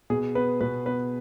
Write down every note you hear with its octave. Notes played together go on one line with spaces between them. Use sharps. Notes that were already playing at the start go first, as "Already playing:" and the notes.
B2 G#4
B3 B4
B2 B4
B3 B4